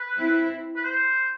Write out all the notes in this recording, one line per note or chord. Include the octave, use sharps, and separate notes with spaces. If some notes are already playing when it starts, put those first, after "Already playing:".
Already playing: B4
C4 E4
B4
C5